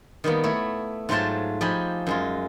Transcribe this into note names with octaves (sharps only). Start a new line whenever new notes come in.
D#3 G3 A#3 B3
A3 E4 C#5
G#2 F#3 A3 F4 C5 A5
F3 D#4 G4 G#5 B5
F#2 G#3 F4